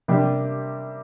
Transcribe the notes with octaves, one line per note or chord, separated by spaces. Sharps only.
C3 G3 A#3 D4 G4